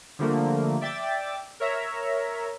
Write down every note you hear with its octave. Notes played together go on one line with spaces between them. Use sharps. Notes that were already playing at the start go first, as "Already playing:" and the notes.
D3 F3 G3 A3 A#3
D5 E5 G5 D6 A6
A#4 C#5 E5 A#5